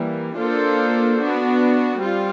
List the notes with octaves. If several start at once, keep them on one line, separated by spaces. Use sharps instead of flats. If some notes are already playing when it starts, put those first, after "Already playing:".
Already playing: E3 G3 A#3
A#3 D4 F4 A4 C5
B3 D4 F#4
G3 C4 F4